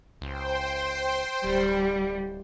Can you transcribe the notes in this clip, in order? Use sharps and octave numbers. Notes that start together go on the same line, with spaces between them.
C#2 C5 G5 C6
D1 G3